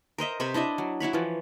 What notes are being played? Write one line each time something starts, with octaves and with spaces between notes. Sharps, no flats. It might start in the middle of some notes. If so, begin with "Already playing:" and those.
A#4 C5 D#5 E5
C3 C5 B5 C#6
D4 E4 D#5 E5
F#3
E4 F#4 C#5 B5
E3 F3